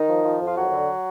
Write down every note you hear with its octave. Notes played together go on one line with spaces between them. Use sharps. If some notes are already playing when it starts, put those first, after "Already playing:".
Already playing: D#3 D#4
F3
F3
F2 F4
D#2 F#3 F#4
D3